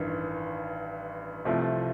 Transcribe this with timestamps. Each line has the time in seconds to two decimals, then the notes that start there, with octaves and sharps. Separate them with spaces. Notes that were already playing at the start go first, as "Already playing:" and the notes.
Already playing: A1 G2 D#3
1.45 C2 C3 F3 A3